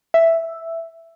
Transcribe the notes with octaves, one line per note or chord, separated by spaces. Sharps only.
E5